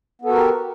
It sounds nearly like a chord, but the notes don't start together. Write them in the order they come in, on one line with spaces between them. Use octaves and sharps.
B3 A4 F#4 A#4 G4